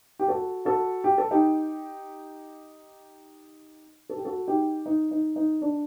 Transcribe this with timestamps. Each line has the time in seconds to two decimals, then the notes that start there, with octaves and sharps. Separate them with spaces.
0.19 G4
0.28 F#4 A4
0.65 F#4 A4
1.04 G4
1.18 A4
1.31 D#4 G4
4.09 A4
4.17 G4
4.25 F#4 A4
4.47 D#4 G4
4.86 D#4
5.11 D#4
5.36 D#4
5.62 D4